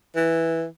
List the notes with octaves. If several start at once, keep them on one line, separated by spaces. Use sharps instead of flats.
E3